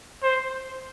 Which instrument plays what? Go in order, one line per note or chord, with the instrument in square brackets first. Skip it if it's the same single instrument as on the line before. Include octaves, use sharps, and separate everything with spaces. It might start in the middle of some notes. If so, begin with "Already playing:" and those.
[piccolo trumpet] C5